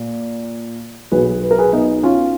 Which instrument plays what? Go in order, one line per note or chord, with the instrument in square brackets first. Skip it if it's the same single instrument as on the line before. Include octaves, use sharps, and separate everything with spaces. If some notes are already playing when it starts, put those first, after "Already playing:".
Already playing: [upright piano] A#2
B1 B2 G#4 B4
B4
A#4
G#4 B4
B3 D#4
C#4 F4